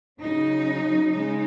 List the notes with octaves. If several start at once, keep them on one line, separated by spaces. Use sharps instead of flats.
C#3 F#3 D#4
C#3 G#3 D#4